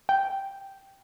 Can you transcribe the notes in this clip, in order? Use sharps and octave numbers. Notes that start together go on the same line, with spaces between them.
G5